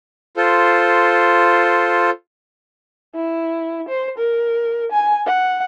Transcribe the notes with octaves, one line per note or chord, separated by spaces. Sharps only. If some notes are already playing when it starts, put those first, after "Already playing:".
F4 A4 C5
E4
C5
A#4
G#5
F#5